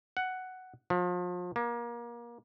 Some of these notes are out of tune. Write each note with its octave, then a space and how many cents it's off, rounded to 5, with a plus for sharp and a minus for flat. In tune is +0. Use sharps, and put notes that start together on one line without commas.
F#5 +5
F3 +35
A#3 +30